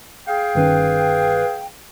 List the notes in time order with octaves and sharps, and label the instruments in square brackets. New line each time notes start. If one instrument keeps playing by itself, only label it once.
[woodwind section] G#4 F5 G5
[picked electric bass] G1 D#3 C#4 [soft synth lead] B4